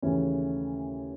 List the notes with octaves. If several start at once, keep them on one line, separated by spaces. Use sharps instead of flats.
D#2 C#3 E3 A3 C#4